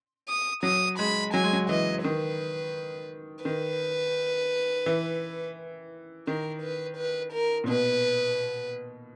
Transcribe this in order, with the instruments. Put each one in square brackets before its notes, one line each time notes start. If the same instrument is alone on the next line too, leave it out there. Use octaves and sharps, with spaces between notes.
[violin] D#6
[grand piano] F#3 [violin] D#6
[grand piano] G#3 [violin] B5
[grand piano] F#3 [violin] G#5
[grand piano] G#3
F#3
[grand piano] E3 [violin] D#5
[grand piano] D#3 [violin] B4
[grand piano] D#3 [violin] B4
[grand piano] E3
[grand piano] D#3 [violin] A#4
[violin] B4
B4
A#4
[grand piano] A#2
[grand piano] B2 [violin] B4